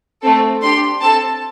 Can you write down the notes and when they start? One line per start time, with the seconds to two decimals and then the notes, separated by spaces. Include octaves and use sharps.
0.22 A3 C4 A4
0.61 D4 G4 C6
1.01 C4 A4 A5